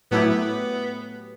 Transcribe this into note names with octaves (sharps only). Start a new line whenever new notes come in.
A2 F#3 A3 B3 E4 G4
B3